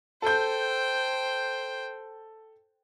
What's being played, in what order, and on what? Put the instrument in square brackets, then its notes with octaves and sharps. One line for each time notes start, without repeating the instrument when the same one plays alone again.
[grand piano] A4 G6 [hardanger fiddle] C5 G5